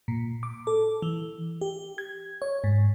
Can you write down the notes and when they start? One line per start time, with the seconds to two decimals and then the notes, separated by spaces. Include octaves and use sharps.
0.08 A#2
0.43 D6
0.67 A4
1.02 E3
1.61 G4
1.98 G#6
2.42 C#5
2.64 G#2